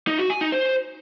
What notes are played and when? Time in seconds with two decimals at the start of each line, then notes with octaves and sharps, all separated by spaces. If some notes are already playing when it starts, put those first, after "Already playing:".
0.07 D#4
0.19 F#4
0.30 G#5
0.41 D#4
0.52 C5